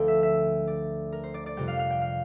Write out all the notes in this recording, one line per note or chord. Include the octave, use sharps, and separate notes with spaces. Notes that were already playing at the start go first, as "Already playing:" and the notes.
Already playing: D2 D3 F3 A3 G5
E5
E5
D5
A#4
C5
D5
D5
F2 C3 G3 G5
F5
F5
G5
F5